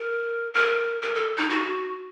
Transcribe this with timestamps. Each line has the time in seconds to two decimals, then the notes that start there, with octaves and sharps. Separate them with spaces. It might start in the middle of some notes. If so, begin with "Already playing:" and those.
Already playing: A#4
0.54 A#4
1.02 A#4
1.15 A4
1.38 D#4
1.50 F#4